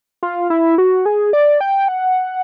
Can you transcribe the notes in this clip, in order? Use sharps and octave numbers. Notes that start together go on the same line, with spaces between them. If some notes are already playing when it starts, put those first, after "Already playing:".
F4
E4
F#4
G#4
D5
G5
F#5